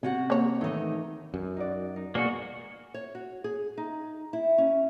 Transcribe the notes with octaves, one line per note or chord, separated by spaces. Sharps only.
C3 C#4 F#4 F#5
A#3 C#5
D#3 E3 A3 D#4
F#2
D#4 F#4 D5
D#4
B2 A#3 F#4 G#4 D5
C#5
F#4
G#4
D#4
E4
C#4